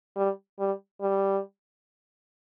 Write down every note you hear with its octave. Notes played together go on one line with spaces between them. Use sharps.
G3
G3
G3